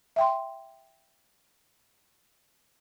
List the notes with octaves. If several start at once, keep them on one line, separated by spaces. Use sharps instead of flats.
E5 G5 C6